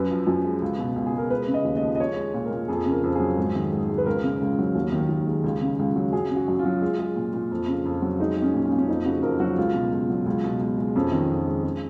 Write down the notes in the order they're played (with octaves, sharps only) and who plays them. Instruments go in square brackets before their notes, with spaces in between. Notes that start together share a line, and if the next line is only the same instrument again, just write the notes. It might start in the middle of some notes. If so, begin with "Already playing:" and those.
Already playing: [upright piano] F#2 B4
F3
F#2
G#3
C#2
B2
C#2
G#4
G#3
A#4
G#3 B4
C#3
D#5
D#2
D#5
F3
D#5
G#3 C#5
G#3
A#2
A#4
A#2
F2 G#4
C#3
A#4
F2
F#3 G#4
G#2
D#3
G#2
G#3
B4
C#2 A#4
C#3
C#2
F#3
D#2
D#3
D#2
G#3
C#2
C#3
C#2
F#3
F#2 G#4
C#3
F#4
F#2
F4
F#3
G#3
G#3
A#2
A#2
F2
C#3
F2
F#3
G#3 D#4
G#3 C#4
A#2
C#4
A#2
C#4
F2 D#4
C#3 F#4
F2 A#4
F#3 F#4
C#2 F4
B2
C#2
F#3
C#2
B2
C#2
G#3
F2 C#4
D#3
F2
G#3
G#3